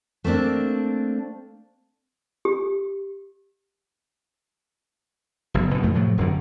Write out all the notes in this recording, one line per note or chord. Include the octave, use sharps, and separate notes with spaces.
A3 A#3 C4 D4
G4
F#1 B1
D2 B2 D#3 E3
F2 A3
A2 C3 F3 F#3
E1 F#2 D3 D#3